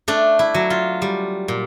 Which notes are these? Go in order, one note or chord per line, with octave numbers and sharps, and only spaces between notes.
A3 D4
E4
F#3
F4
G3
A#2